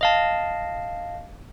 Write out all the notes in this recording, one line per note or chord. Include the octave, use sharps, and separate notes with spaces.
D#5 F5 A5